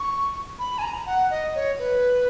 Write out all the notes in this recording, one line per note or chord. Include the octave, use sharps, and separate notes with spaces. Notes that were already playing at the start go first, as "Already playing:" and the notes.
Already playing: C#6
B5
G#5
A#5
F#5
D#5
C#5
B4